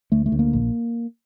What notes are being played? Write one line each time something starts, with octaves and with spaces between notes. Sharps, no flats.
D2 A3
A3
D2
A#3
A#1